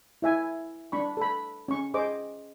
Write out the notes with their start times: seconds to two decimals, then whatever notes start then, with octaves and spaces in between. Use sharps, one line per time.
0.22 E4 E5 G#5
0.92 D4 B5 C#6
1.17 A4 B5
1.68 C#4 C#6
1.94 G#4 C5 D#5 D6